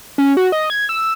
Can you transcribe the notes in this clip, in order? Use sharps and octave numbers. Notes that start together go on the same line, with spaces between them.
C#4
F#4
D#5
G#6
E6